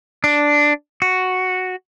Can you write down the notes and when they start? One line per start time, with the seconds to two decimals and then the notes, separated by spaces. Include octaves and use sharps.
0.24 D4
1.02 F#4